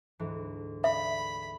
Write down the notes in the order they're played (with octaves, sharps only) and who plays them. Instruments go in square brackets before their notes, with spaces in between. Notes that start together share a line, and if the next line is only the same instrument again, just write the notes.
[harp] D2 G#2 E3
[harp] B4 D5 [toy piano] E5 [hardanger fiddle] B5